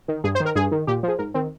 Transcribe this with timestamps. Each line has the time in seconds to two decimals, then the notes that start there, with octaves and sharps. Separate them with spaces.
0.08 D#3
0.24 G2 G#4
0.35 C5
0.40 D#3
0.45 A#4
0.56 G2 G#4
0.71 D#3
0.87 A#2 G4
1.03 F3
1.08 G#4
1.19 G#2 A#4
1.34 D#3 C4